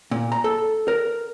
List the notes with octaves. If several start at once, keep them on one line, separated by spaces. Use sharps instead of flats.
A#2
A#5
A4
A#4